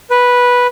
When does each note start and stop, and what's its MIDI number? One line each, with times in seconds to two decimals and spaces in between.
0.10 0.67 71